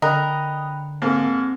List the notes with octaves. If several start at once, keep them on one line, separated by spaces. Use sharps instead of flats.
D3 A#4 D#5 G5 B5 F#6
G#2 A#3 C4 A4